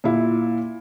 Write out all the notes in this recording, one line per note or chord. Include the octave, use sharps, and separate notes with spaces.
A#2 E4